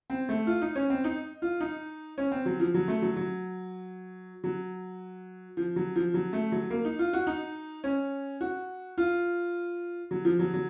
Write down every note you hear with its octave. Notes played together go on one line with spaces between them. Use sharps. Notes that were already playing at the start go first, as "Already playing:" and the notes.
C4
A3
F4
D#4
C#4
C4
D#4
F4
D#4
C#4
C4
F#3
F3
F#3
A3
F#3
F#3
F#3
F3
F#3
F3
F#3
A3
F#3
A#3
D#4
F4
F#4
D#4
C#4
F#4
F4
F#3
F3
F#3
F#3